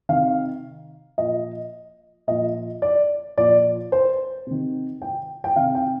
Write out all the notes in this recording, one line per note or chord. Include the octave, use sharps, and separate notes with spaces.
C3 D#3 F5
A#2 F3 D#5
A#2 F3 D#5
D5
A#2 F3 D5
C5
C3 D#3
G5
G5
C3 D#3 F5
G5